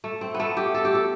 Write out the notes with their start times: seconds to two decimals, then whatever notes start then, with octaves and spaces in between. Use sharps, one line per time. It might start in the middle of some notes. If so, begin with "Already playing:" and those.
0.04 A3
0.21 C4
0.34 B3
0.40 A3
0.57 G4
0.74 A4
0.85 G4
0.95 A4